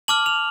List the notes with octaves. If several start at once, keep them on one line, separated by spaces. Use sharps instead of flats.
A5 D6 F6 F#7
F7